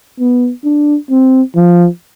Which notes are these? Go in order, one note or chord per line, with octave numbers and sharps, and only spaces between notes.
B3
D4
C4
F3